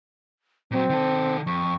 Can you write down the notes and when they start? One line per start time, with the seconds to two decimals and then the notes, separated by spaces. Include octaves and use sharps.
0.71 A#2 F#3 C4
0.90 D#3 A4
1.47 F2 C#6